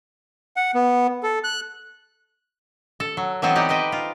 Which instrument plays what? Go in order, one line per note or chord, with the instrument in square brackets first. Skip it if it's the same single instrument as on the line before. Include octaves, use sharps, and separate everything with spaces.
[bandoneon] F#5
B3
A4
F#6
[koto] A4
F#3
E3 F#3 B3 C4 A4 D#5
D#4 G4 D5 F#5
B4 C5 D#5 G5
F4